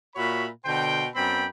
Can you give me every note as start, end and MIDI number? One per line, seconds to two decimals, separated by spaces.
0.16 0.46 46
0.16 0.46 66
0.16 0.46 73
0.16 0.46 76
0.16 0.46 83
0.65 1.06 47
0.65 1.06 50
0.65 1.06 72
0.65 1.06 79
1.15 1.45 42
1.15 1.45 59
1.15 1.45 60
1.15 1.45 74
1.15 1.45 79
1.15 1.45 83